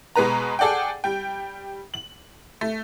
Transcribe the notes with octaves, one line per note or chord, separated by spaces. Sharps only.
B2 G#3 B3 B4 A#5
G#4 A4 D5 F#5 G5
G3 G5
F#7
A3